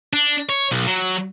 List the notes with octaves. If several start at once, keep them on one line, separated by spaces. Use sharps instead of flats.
D4
C#5
B1
F#3